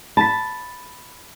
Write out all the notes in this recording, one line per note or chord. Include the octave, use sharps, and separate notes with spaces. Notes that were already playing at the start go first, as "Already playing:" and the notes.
A5 B5 B6